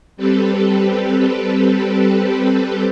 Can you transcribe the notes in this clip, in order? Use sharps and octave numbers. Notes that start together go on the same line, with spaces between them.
G3 C4 G4 A4 B4